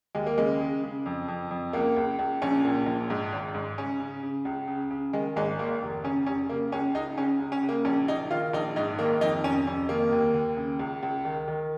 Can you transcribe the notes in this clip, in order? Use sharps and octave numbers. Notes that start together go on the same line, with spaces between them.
D#2 G#3
A#3
C#3 G#3
C#3
C#3
F2
F2
F2
C#2 A#3
C#2
C#2
A#1 C#4
A#2
A#1
G#2
G#1
G#2
C#3 C#4
C#3
C#3
C#2
C#3
C#3
D#3 G#3
G#1 G#3
D#3 A#3
F1
C#3 C#4
F1 C#4
C#3 A#3
C#2 C#4
C#2 D#4
C#3 C#4
C#2
C#4
C#3
A#3
A#1 C#4
A#1 D#4
D#3 F4
A#1 D#4
G#2 D#4
D#3 A#3
F2 D#4
F1 C#4
F2 C#4
D#3 A#3
D#2
D#2
C#3
C#2
C#2
D#3
D#3